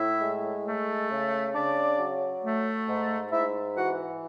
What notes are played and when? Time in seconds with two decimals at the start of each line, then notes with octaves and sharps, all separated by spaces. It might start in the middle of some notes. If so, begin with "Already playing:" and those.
Already playing: A2 E4 E5
0.22 G#3
0.66 A3
1.11 C#3
1.55 C#3 D4 D5
1.99 F#3
2.44 A3
2.89 G#2
3.32 G#2 E4 E5
3.76 E3 F#4 F#5